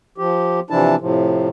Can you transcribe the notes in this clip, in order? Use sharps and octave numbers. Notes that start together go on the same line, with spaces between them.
F3 G4
C3 E3 F3 D4 E4 A5
A2 C3 F3